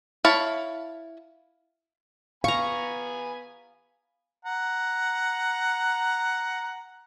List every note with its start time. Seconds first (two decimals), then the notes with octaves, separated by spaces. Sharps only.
0.25 E4 C#5 F5 A5 B5
2.44 B3 F5 G#5 A#5 B5 C#6
4.45 F#5 A#5